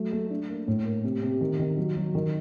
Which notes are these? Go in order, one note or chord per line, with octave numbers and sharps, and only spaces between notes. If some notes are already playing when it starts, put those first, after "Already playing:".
Already playing: F#3 A3
A3
D4
A#3
A2
A#3
C3
C3
D#3
D#3
F#3
F#3
D#3